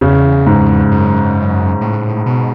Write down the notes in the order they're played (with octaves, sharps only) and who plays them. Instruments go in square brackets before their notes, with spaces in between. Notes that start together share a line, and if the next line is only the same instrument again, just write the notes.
[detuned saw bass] E2 [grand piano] C#3
[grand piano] G#2
[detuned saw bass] F#2
A2
B2